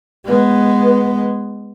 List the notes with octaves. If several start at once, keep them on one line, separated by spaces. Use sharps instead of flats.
G#3 B3